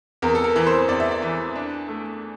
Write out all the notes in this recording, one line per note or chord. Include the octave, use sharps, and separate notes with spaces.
E2 A#4
A4
A#4
E3 A#4
C5
E2 D5
E5
D5
E3
D4
A3